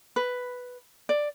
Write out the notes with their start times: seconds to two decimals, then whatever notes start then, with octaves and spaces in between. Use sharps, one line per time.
0.16 B4
1.09 D5